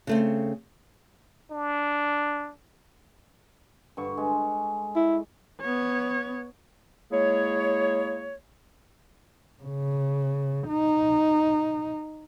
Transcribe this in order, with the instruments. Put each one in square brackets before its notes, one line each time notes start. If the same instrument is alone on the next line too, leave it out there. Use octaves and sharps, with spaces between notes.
[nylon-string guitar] C#3 A3 C4
[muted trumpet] D4
[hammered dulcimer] G2 D3 C#6
G#3
[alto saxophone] E4
[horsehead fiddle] B3 C#5
[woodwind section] G#3 A#3 E4 G#4 C#5
[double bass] C#3
D#4